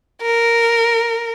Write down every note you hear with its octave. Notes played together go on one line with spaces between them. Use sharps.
A#4